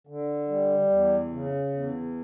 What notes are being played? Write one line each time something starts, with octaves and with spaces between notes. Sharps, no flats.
D3
G3
E2
C#3
E2